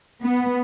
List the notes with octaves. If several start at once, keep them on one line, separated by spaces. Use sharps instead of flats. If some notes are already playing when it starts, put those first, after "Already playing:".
B3